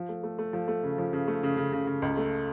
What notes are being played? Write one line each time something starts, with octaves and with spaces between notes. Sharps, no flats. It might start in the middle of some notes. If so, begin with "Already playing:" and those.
Already playing: F3
A3
A3
A3
F3
A3
C#3
F3
C#3
A3
C#3
C#3
C#3
C#3
C#2
A3